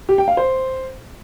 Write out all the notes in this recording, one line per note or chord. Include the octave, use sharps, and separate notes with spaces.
G4
G5
F5
C5